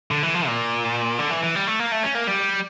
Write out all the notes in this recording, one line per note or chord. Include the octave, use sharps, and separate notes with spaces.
D3
E3
F3
A#2
D3
E3
E3
G3
A3
A#3
A3
C#4
A#3
G3